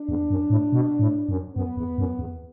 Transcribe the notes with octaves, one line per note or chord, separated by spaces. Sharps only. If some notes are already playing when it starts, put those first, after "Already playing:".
Already playing: D4
E2
F#2
A2
B2
A2
F#2
F#2 B3
E2
F#2
E2